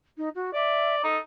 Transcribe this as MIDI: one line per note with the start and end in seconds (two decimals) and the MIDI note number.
0.17 0.29 63
0.35 0.54 66
0.54 1.02 74
0.54 0.95 76
1.04 1.18 63
1.04 1.20 69